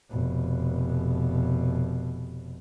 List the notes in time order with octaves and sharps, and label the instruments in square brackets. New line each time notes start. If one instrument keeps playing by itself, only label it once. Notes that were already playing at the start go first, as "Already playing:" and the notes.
[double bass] F1 B2